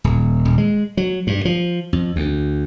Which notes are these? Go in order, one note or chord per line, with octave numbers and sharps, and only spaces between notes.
D#1
D#1
G#3
F#3
G2
F3
F2
D2